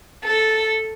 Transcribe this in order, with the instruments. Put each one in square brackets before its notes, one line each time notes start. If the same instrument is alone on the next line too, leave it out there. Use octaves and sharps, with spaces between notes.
[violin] A4